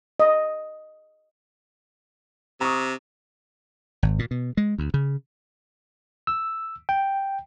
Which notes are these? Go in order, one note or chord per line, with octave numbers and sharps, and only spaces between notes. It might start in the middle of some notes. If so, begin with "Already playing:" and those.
D#5
C3 A#5 C#6 D#6
G#1
A#2
B2
G#3
D2
C#3
E6
G5